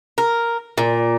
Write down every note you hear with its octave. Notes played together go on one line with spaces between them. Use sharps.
A#4
A#2